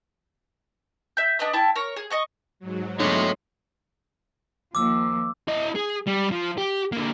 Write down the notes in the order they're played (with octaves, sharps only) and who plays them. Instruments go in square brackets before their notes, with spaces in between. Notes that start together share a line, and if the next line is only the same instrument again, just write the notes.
[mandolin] E5 G6
D4 B4 D#5 D#6
E4 G5 A5
A#4 C#5
G#4
D#5 C#6 D#6
[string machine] G#2 F#3
[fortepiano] E2 B2 D3 [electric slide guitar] A3 C#5 [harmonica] D#5 C6
[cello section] D#2 F3 A#3 [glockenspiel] D6 E6
[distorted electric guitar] E4 D#5
G#4
G3
F3
G4
D3 A#3